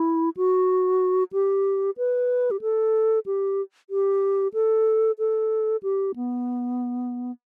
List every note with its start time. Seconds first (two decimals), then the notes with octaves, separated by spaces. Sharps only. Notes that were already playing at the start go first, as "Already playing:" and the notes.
Already playing: E4
0.37 F#4
1.33 G4
1.98 B4
2.51 G4
2.61 A4
3.26 G4
3.90 G4
4.54 A4
5.19 A4
5.83 G4
6.16 B3